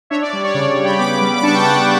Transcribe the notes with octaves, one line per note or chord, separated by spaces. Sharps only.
D4 C#5 E5
D5
G3 D5
C#5
C#3 D5
D5
C#3
G5 B5
B3 B5 D6
G3
D6
D4 A5 C#6
G5
C#3 F#5 A5